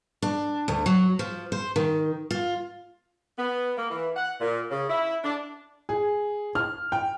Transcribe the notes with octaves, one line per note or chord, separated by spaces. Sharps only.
D4
D2
F#3
F3
C5
D#3
F4
B3
A#3
E3
F#5
A#2
C#3
E4
D4
G#4
F6
G5